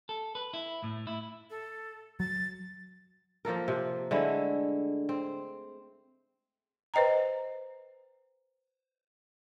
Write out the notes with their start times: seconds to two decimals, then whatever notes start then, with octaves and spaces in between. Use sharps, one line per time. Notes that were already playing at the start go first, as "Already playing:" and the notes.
0.09 A4
0.35 B4
0.54 E4
0.84 A2
1.07 E4
1.50 A4
2.20 F#3 A6
3.45 F3 A#3 A4 A#4
3.68 C3
4.11 D3 G#3 A3 E4
5.09 C4
6.94 B4 C5 D#5 G5 A#5